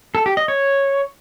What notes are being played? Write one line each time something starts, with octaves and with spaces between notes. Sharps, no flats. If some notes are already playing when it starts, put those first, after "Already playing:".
A4
G4
D#5
C#5